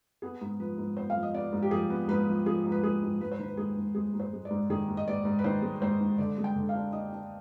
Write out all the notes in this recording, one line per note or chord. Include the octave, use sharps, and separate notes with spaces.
B3 G#4
G#2
F3 B4
G#2
B3 C5
F5
F3
D#5
B3 D5
G#2
G4
F3 G#4
B3
G#2 B4
F3
F3 G#4
G#2
B4
G#2 G#4
G#2
G#2 B4
C5
D#3 B4
G#2 G#4
G#2
G#3 G#4
G#2
C5
G#3
D5
G#2
D#3 G#4
G#2
D#5
G#2 D5
G#2
B4
D#3 C5
G#3
G#2 C5
G#2
D3 D5
G#3
G5
D3
F5
D4
D4 D#5
D4